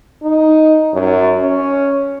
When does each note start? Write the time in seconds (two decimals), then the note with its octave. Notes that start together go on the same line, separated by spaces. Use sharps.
0.23 D#4
0.94 F#2
1.40 C#4